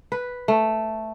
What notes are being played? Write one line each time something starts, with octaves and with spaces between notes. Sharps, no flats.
B4
A3